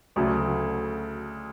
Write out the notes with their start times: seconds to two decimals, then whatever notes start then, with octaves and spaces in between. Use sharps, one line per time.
0.16 D2 C#3 F#3 A3